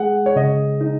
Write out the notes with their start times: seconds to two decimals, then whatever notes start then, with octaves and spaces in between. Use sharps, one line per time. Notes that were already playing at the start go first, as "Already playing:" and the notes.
Already playing: G#3 G#4 F#5
0.26 C#5
0.36 C#3 D#5
0.81 D#4